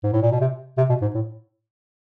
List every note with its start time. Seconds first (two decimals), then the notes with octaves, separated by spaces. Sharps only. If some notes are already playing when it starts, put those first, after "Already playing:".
0.04 G#2
0.13 A2
0.22 A#2
0.31 B2
0.41 C3
0.78 C3
0.89 B2
1.02 G#2
1.15 A2